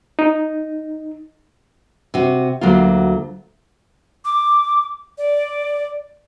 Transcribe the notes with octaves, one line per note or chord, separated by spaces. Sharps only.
D#4
C3 F#4
D2 F#3 A#3 F4
D6
D5